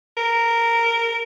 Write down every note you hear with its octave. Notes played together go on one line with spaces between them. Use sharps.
A#4